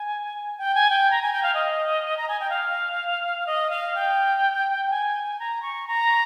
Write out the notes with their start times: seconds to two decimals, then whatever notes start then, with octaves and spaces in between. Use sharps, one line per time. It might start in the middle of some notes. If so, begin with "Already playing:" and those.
Already playing: G#5
0.58 G5
0.75 G#5
0.90 G5
1.11 A#5
1.22 G#5
1.33 G5
1.43 F5
1.54 D#5
2.17 A#5
2.28 G#5
2.40 G5
2.50 F5
3.47 D#5
3.70 F5
3.95 G5
4.90 G#5
5.39 A#5
5.62 C#6
5.87 A#5